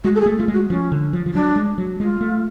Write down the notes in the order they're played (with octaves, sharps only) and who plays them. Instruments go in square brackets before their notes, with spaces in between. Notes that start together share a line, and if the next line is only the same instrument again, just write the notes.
[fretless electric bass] G#3 [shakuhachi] F#4
[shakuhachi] A4
G#4
[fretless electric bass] A3
[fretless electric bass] A3 [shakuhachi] F4
[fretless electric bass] G#3
[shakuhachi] F#4
[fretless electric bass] F3 [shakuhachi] C#4
[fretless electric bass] D3
F3
F3
[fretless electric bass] F#3 [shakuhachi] D4
[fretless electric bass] G#3
F#3
[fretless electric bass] G#3 [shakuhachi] F4
[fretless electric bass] A3